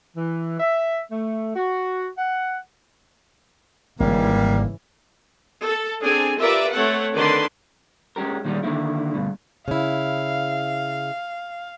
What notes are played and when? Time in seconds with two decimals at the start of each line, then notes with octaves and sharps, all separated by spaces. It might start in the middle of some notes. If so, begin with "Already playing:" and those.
0.17 E3
0.60 E5
1.11 A3
1.56 F#4
2.18 F#5
4.00 G#1 G#2 C#3 E3 G3 A#3
5.64 A4
6.04 C4 D4 G#4 G#5
6.39 F4 G4 A#4 B4 D5 E5
6.73 A3 C4 A4 C#5 F#5
7.15 D3 D#3 D4 B4 D5 C6
8.16 G#3 C#4 D4 G4 A#4
8.45 A#2 D#3 G3 G#3 C#4
8.63 D3 D#3 A3 A#3 E4
9.14 D2 G2 B2
9.68 C#3 E4 F5